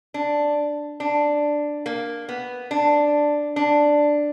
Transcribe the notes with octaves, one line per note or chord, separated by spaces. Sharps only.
D4
D4
A#3
B3
D4
D4